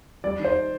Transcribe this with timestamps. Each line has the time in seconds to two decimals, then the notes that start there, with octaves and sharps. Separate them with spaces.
0.24 G3 D5
0.39 D#3
0.45 C5